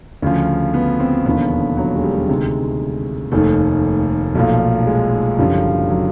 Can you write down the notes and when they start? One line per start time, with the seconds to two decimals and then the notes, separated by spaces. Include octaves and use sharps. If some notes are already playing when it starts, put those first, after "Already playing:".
0.22 D2 C#3 F3
0.74 B3
1.00 C4
1.25 E1 D#2 D3 F3 B3
1.77 F#3
1.96 G#3
2.03 G3
2.29 D2 C3 D#3 G#3
3.32 F1 D#2 D#3 A3
4.35 B1 A#2 F3 A3
4.87 G#3
5.38 F#1 F#2 D3 F3 G3
5.90 F#3